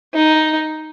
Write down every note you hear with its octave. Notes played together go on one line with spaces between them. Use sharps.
D#4